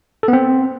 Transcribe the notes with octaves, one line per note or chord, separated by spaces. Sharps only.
A4
B3
C4